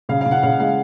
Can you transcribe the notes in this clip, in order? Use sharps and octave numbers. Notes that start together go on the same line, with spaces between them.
C#3 F5
F5
C#3
F#5
C#3 F5
G#3 F5